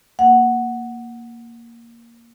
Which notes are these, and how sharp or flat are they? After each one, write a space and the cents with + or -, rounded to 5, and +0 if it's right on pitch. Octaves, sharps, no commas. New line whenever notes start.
A#3 +0 F#5 +0